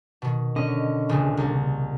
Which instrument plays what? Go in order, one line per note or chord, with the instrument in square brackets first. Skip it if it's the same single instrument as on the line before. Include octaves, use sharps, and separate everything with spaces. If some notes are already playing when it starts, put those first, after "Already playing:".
[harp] B2 D#3
[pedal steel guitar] D3 C#4 [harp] D#5
[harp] D#1 A#1 C#3
C2